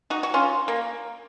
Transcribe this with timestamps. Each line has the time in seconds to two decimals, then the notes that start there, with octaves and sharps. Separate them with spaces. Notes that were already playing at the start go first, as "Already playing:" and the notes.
0.10 D#4 F#4
0.23 F#4
0.34 C#4 F4
0.68 A#3